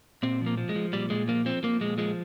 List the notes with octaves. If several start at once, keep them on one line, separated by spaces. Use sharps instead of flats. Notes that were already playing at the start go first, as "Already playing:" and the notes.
A#2 C4
F3
A#3
F3
G#3
F3
A#2 G3
A#2 G#3
F3 A#3
F3 C4
F3 A#3
A#2 G#3
F3 G#3